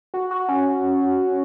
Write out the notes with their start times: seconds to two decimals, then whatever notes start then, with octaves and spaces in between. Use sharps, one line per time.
0.14 F#4
0.31 F#4
0.49 C#4